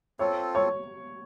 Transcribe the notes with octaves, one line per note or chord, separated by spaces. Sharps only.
C4 F4 A4 C#5
C#5